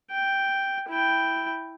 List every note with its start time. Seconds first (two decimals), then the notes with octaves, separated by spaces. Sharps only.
0.12 G5
0.89 E4 G5